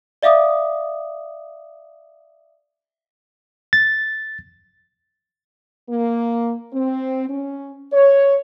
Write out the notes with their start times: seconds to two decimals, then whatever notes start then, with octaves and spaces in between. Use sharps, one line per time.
0.23 D5 E5 F5 D6 D#6
3.73 A6
5.89 A#3
6.73 C4
7.29 C#4
7.92 C#5